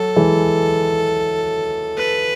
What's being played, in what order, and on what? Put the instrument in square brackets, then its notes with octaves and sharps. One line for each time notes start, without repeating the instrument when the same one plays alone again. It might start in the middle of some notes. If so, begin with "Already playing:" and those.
Already playing: [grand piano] F#3 [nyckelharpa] A4
[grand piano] E3 G#3
[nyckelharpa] B4